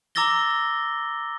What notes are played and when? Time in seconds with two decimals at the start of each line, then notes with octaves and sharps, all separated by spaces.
0.15 A#5 D6 E6 A6 A#6 G7